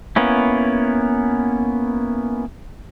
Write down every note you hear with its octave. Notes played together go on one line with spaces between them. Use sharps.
A#3 B3 C#4 E4